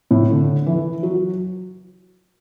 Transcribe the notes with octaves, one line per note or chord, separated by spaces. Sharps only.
A2
D3
E3
F#3